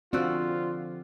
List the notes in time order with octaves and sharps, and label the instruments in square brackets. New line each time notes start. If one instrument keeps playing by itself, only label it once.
[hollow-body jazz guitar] D3 F3 F#4 [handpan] C4 [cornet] F4 [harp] D5 E6 F#6